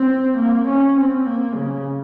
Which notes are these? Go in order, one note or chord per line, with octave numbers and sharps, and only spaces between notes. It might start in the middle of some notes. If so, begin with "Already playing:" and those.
Already playing: C4
A#3
C#4
C4
A#3
C#3